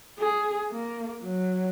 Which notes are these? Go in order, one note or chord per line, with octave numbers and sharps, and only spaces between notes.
G#4
A#3
F#3